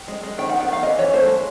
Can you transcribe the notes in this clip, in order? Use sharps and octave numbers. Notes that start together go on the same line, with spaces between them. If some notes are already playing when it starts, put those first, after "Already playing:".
Already playing: G5
G#3
G#3
D#3 G5
F#5
B3
F#5
D#3 F5
E3 D#5
E3 C#5
A3 C5
G#3